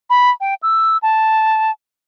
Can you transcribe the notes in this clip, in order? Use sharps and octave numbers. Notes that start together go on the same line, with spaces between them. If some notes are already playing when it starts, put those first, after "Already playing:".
B5
G5
E6
A5